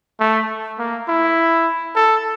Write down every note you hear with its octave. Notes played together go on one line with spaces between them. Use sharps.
A3
A#3
E4
A4